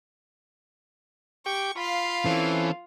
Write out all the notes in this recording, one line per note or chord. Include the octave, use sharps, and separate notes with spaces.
G4 G5 C#6 D6
F4 F5 B5
E3 C4 C#4 A4